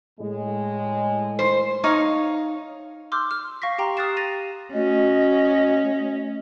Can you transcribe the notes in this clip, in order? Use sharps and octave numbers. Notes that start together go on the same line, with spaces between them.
A2 G#3
C5
D#4 C#5 F5
C6 D6 E6 F6 G6
F6
F5 C#6 A#6 B6
G4 G5 A#5 C6
D#6 F6 F#6 A6 C7 E7
A6 A#6 D#7 F7
A3 C#4 F#4 D#5